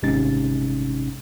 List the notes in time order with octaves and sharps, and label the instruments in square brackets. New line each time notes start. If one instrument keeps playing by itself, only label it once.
[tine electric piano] G#1 C3 G#3 C#4 D#4 A6